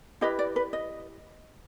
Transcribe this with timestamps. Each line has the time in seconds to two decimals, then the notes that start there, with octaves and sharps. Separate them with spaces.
0.21 E4 G4 B4 D#5
0.39 D5
0.56 B4
0.73 D#5